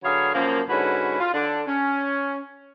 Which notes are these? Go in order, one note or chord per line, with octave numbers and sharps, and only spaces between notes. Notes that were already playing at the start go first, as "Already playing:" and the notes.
D3 F#3 G#4 B4 C#5 F5
F#2 F3 A#3
G#2 D3 C#4 E4 F#4 B4
F4
D3 D4
C#4